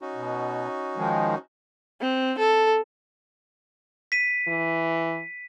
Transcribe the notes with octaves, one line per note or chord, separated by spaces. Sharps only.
C#4 D#4 F#4
B2
D#3 F3 G#3
C4
A4
B6 D#7
E3